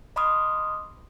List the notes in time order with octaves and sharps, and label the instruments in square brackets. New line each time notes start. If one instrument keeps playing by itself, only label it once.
[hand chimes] D#5 B5 C6 D6 D#6 F6